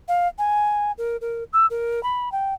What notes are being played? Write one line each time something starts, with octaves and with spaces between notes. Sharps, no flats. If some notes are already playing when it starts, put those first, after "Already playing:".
F5
G#5
A#4
A#4
E6
A#4
B5
G5